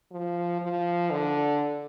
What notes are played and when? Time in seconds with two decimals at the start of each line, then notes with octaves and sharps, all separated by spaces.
0.11 F3
0.61 F3
1.10 D3